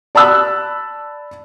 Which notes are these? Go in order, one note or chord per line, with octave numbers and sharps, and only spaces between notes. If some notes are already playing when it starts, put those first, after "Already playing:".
D5 A5 B5 E6 F#6